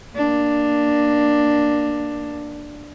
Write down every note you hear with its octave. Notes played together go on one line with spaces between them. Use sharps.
A#3 D4